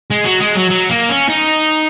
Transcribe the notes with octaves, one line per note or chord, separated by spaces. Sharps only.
G#3
F#3
G#3
F#3
F#3
A#3
C#4
D#4